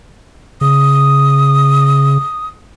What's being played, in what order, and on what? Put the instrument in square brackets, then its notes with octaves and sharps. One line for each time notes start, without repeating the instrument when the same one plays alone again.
[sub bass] C#3 [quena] D#6